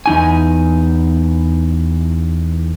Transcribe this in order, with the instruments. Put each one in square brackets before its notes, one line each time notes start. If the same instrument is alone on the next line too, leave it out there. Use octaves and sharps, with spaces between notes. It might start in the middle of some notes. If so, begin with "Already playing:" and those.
[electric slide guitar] E2 D#4 G#5